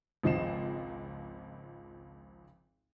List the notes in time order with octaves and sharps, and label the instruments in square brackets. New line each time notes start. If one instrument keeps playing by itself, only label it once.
[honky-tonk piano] G#1 C#2 F3 D#5 C7 E7